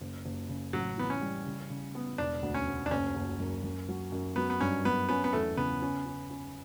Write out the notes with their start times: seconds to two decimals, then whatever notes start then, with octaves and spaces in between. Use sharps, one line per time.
0.01 F#1
0.25 F#1
0.49 C#3
0.73 A1 F#3
0.98 E3 B3
1.10 C#4
1.21 G3
1.46 C#3
1.70 C#3
1.95 B3
2.18 E1 D4
2.42 D2
2.54 C#4
2.67 D2
2.86 D4
2.91 F#1 C#4
3.16 F#1
3.40 F#2
3.64 F#2
3.89 F#3
4.12 F#2
4.36 F#3 B3
4.50 B3
4.61 G2 C#4
4.85 F#3 B3
5.09 B3 C#4
5.24 B3
5.33 E2 A3
5.57 C#3 B3
5.82 C#4
6.06 C#4
6.30 C#4